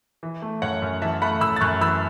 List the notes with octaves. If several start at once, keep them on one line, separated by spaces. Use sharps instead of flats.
E3
A3
F#2 C#5 F#5
F#2
E3 E5 A5
A3 F#5 B5
F#2 B5 E6
A6
F#2 C#6 F#6
E3 B5 E6